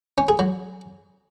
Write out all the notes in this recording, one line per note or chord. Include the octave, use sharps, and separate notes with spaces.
C#4
G#4
F#3